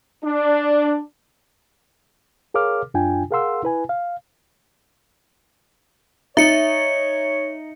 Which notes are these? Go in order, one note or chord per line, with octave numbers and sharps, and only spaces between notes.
D4
G#4 A#4 C#5 F5 D6 F6
F#2 D4 F4 G5 G#5
G#4 A#4 F5 F#5 C6 E6
E4 B4 G#5
F5
D#4 C#5 E5 C#7